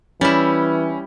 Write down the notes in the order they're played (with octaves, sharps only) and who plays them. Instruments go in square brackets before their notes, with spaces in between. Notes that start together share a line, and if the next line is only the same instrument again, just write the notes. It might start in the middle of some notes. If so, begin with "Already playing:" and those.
[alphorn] E3 [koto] G3 E4 [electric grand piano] C#4